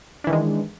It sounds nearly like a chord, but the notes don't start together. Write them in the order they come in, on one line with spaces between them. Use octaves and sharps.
D4 E3 D#3 G#3